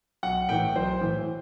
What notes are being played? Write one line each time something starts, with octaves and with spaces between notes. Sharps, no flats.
B1 F#5
A2 E3 G5
B1 C5
A2 E3